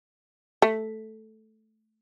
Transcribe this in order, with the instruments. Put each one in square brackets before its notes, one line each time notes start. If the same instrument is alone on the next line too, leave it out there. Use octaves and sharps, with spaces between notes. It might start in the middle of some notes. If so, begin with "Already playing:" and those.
[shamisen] A3